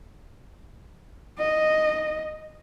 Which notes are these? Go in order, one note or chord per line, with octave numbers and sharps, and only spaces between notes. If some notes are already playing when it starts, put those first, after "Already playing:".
D#5